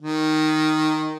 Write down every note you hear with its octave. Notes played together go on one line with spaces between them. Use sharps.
D#3